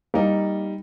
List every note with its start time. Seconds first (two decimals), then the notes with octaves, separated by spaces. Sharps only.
0.14 G3 A#3 D#4